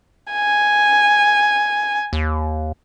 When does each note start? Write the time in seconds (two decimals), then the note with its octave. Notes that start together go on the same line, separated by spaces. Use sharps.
0.32 G#5
2.13 D#2